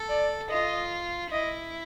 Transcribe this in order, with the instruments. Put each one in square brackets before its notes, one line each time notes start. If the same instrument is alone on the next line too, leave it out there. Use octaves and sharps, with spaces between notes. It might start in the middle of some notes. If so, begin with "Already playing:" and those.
Already playing: [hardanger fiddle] A4
[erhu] D5
[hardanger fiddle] F4 [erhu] D#5
[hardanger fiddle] E4 [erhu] D#5